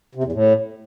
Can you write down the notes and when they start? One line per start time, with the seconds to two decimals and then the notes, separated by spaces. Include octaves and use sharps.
0.15 C3
0.24 E2
0.32 A2